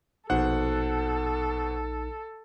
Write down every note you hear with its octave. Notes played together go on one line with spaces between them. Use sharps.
A#1 B2 D#4 A4 C5 F#5 F#6